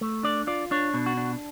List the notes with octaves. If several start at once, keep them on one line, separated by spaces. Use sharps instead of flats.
A3
D4 D5
F4 D5
D4 C#5
B2
F#4
D4